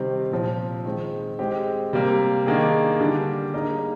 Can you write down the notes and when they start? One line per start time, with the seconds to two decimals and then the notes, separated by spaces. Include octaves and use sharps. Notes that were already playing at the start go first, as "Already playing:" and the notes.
Already playing: C3 D#3 G3 C4
0.31 A#2 F3 C4
0.85 D#3 G#3 C4
1.39 G#3 C4 G4
1.93 C3 G3 A#3
2.46 D#3 A#3 D4 G#4
3.00 D3 G3 D4
3.53 G3 A#3 D#4 G#4